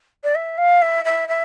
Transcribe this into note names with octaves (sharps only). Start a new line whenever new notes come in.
D5
E5
F5
E5
E5
E5